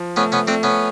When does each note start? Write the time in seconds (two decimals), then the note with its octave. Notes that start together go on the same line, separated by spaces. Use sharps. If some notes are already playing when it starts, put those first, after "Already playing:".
Already playing: F3
0.16 A3 B3 C#4
0.32 B3 C#4
0.47 A3 C4 D4
0.63 B3 C#4